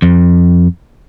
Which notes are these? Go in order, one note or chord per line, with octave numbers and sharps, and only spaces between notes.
F2